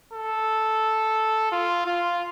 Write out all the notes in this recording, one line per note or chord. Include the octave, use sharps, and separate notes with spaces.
A4
F4
F4